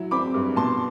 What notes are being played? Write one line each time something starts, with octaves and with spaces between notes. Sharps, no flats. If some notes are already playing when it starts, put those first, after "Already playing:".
Already playing: F#3 E4
C4 B5 D6
G2
B2 A5 C6